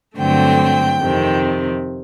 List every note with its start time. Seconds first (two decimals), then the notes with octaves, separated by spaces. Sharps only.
0.18 G2 D3 F#3 A3 C4 G5
1.01 F2 C3 D#3